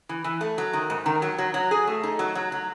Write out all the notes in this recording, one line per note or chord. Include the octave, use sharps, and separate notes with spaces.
E3
E3
A3
F#3
D#3
G#2
D#3
F#3
F#3
F#3
G#4
A3
D#4
F#3
F#3
F#3